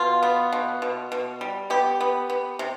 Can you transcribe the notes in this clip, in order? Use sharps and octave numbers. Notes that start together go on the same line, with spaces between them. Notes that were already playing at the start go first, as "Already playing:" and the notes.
Already playing: B2 F4
B3
B2
B2
B2
G3
B3 G4
B3
B3
C3